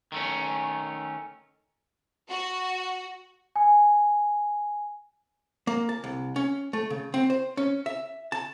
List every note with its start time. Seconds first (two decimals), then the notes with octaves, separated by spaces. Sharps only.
0.12 D#3 A3 C#4
2.29 F#4
3.56 G#5
5.67 A#3
5.89 A5
6.04 C2
6.36 C#4
6.73 A3
6.90 C#3
7.14 C4
7.30 C5
7.57 C#4
7.86 E5
8.32 A5